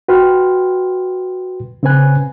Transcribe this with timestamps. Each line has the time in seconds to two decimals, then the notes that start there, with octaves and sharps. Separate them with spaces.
0.08 F#4 B4 G5 C6 F6
1.83 C#3 C4 C#4 B4 G#5 F#6